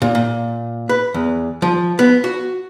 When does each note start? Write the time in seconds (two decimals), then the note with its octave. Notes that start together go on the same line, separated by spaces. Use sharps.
0.02 A#2
0.15 A#2
0.89 B4
1.14 E2
1.62 F3
1.99 B3
2.24 F#4